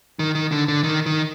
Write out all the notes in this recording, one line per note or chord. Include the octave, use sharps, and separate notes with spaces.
D#3
D#3
D3
D3
D#3
D#3